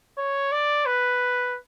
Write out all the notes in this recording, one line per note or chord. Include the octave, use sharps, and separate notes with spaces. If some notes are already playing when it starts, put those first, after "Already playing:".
C#5
D5
B4